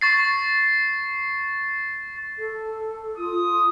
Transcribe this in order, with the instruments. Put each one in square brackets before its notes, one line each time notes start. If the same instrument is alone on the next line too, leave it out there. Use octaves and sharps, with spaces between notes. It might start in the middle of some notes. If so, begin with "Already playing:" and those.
[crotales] C#6 A6 C7
[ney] A4
[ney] F4 [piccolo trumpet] D#6